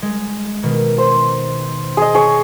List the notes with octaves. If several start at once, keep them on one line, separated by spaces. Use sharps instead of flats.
G#3
B2 D#3
C5
G#4 D#5
G#4 C#5